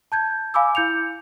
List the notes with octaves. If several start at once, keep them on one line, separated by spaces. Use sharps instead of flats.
A5 G6 G#6
F5 G#5 B5 D6 E6
E4 G6 C#7 F7